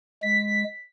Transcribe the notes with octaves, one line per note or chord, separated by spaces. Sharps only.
G#3 B6